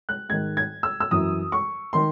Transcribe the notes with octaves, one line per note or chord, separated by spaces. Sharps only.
F#6
G#2 D#3 G#6
G#6
E6
E6
F#2 E3 D#6
C#6
D#3 C6